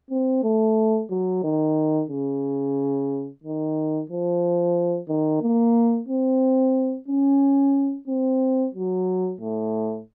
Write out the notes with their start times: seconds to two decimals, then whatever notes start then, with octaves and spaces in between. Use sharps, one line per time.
0.11 C4
0.43 A3
1.10 F#3
1.44 D#3
2.10 C#3
3.43 D#3
4.10 F3
5.09 D#3
5.42 A#3
6.09 C4
7.08 C#4
8.08 C4
8.75 F#3
9.41 A2